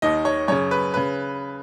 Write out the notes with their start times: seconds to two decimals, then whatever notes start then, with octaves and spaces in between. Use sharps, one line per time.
0.02 D#2 D#3 D#5
0.25 C#5
0.48 F#2 C#3 C#5
0.71 B4
0.94 C#3 B4